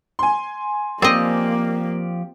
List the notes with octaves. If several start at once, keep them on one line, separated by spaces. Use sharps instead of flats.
G#5 C6
F3 A#3 C4 G4 D5 D#5